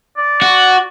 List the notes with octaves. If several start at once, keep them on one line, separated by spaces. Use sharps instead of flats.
D5
F#4